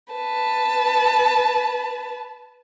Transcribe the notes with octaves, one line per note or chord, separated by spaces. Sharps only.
B4 A5